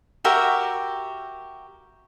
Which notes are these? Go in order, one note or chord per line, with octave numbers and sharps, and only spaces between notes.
F#4 G4 A#4 E5